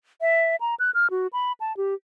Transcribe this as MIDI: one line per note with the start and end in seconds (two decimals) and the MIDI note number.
0.21 0.56 76
0.60 0.75 82
0.80 0.91 90
0.94 1.07 89
1.11 1.27 66
1.33 1.52 83
1.60 1.75 81
1.77 1.94 67